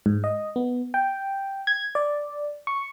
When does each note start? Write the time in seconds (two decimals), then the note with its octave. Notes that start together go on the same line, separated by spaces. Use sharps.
0.06 G#2
0.24 D#5
0.56 B3
0.94 G5
1.67 G#6
1.95 D5
2.67 C#6